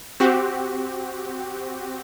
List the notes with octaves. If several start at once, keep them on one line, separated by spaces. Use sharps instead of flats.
C4 F#4 G4